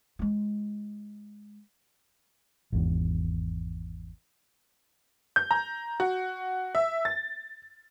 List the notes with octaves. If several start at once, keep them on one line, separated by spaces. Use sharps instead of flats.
G#3 F4
G#1 E2
G6
A#5
F#4
E5
A6